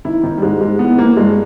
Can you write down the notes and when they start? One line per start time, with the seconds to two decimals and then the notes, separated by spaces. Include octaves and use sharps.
0.05 D#3 E4
0.23 D#3 D#4
0.38 G3
0.42 G#2 G#3
0.61 G#2 G#3
0.79 E3 B3
0.98 E3 A#3
1.17 G2 G#3